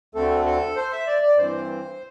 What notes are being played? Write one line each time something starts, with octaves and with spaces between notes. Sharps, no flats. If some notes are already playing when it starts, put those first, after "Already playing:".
D2 D3 A3 C4 A4
A4
C5
E5
D5
D5
G2 E3 C4 C5